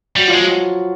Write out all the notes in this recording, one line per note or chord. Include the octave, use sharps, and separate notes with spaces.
F#3 G3 F#4
F3 F4
G#3
F#3 F#4